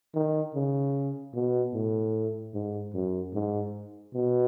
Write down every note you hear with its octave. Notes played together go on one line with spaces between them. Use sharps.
D#3
C#3
B2
A2
G#2
F#2
G#2
B2